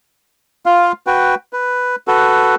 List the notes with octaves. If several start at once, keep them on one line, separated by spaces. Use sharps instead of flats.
F4 F5
F#4 B4 G5
B4
F#4 A4 B4